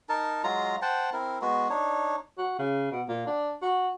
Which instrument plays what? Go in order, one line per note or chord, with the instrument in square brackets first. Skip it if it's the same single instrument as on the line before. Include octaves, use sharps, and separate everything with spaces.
[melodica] D#4 A#4 A5
F#3 G#3 F4 A#5
C5 F#5 G5 A5
C4 E4 A#4
G#3 B3 F#4
D4 D#4 C#5
[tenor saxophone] F#4
C#3
B2
A#2
D4
F#4